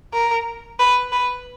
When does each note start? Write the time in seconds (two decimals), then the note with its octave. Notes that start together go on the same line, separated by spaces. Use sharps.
0.13 A#4
0.79 B4
1.12 B4